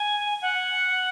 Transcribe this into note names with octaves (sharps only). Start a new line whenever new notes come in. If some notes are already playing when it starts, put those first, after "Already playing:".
Already playing: G#5
F#5